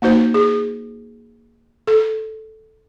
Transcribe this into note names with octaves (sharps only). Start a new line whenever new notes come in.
A#3 D#4 F#4 C5
G#4
A4